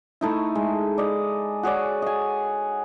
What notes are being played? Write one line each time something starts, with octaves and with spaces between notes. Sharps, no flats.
A3 D#4 E4
G#3
D5 D#5
F#4 G#4 C#5 D5
D#5 G#5